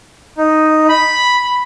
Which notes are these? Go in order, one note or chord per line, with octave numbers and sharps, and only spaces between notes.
D#4
B5
B5